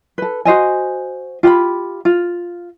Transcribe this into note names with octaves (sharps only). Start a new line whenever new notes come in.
A4 B4
F#4 C5 D#5 G#5
F4 G4 G5 B5
F4